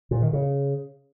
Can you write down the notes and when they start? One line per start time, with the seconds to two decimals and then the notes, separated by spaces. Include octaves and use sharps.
0.11 A#2
0.22 D#3
0.33 C#3